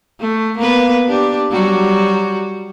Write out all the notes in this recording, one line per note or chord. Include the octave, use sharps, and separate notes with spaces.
A3
A#3 B3 B4
D4 G4
F#3 G3 F#4